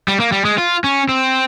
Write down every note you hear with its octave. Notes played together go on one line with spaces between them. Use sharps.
G3
A#3
G3
G#3
F4
C#4
C4